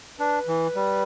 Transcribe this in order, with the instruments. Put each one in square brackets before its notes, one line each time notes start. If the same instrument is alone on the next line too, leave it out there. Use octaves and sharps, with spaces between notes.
[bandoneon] D4 [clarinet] B4
[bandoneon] E3
G3